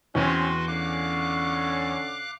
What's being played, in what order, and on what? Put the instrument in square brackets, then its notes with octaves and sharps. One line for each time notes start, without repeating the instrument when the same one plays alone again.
[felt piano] E2 [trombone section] C4 C#4 [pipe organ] F#4 B4 C6
[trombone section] D3 C#4 [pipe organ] F5 D6 F#6